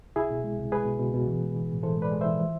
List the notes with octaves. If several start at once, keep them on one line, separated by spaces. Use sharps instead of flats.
C2 E4 G#4
B2
G#3
C2
G#3 G#4 B4
B2
B2
B2
E3
G#3
E3
A2
E3 A4 C5
G#3
B4 D5
G#3
E3 C5 E5
F3